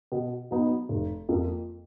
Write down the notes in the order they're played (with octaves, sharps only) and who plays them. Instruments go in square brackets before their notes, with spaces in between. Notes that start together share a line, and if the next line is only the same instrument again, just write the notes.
[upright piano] B2
F#3 B3 D#4
F1
F2 F3 A#3